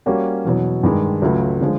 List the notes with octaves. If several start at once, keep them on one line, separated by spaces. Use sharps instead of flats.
G3 A#3 C#4 F#4
E2 B2 F#3
G2 D#3 G#3
C#2 C#3 F#3 A3
D3 F3 G#3